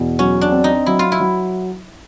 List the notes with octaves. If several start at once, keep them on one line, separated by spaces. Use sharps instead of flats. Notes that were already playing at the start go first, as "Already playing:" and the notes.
Already playing: E2 B2
F#3 C#4
D4
C4
D#4
F#3 E4
F4
E4
F#3